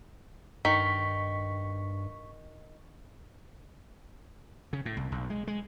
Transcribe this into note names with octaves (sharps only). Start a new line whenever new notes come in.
G2 D#3 C#6 B6
C#3
A2
C2
B1
G#3
G#3